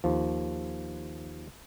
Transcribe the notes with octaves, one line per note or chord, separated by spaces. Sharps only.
D#2 F3